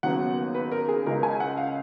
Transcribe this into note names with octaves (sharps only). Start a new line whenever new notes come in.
D#2 C#3 F#3 B3 F#5
B4
A#4
G#4
C#2 C#3 G#3 A#4
G#5
F#5
F5